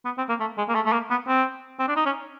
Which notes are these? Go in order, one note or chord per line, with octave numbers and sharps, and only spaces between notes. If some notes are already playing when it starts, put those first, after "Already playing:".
B3
C4
A#3
A3
G#3
A#3
A3
A3
A#3
B3
C4
C4
D4
D#4
C#4